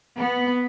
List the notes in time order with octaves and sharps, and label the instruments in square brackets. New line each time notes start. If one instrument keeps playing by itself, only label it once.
[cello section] B3